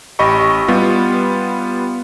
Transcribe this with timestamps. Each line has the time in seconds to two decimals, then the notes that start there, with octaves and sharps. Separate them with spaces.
0.19 A1 G4 D#5 B5 C#6
0.68 G3 B3 F4